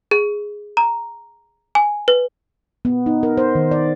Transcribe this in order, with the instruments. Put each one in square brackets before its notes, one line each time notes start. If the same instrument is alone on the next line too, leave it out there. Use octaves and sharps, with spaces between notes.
[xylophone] G#4
A#5
G#5
B4
[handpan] B3
D#4
A#4
C5
D#3
D5